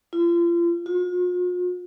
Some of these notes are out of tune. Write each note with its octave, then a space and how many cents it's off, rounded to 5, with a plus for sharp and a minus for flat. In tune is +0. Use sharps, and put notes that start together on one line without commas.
F4 -35
F4 +45